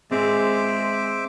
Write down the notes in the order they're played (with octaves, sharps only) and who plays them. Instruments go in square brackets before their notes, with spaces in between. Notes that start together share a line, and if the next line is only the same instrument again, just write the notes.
[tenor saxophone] G#3 [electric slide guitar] C4 G#4 [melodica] C5 E5 D6